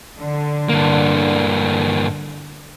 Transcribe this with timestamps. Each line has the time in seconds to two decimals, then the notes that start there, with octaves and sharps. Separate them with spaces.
0.19 D3
0.69 G2 A#3